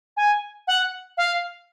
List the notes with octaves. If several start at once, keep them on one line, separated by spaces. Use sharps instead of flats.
G#5
F#5
F5